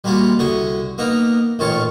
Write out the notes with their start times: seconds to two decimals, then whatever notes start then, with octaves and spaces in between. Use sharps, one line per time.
0.04 G3 G#3 A#3 F4 F#4
0.39 C2 D3 F#4 G#5 D#6
0.98 A#3 B3 D#4 A#4
1.59 A1 A#2 D#3 F4 C#5 A5